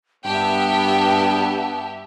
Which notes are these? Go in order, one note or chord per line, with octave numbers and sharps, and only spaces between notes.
G2 B3 G4 E5 G5 A5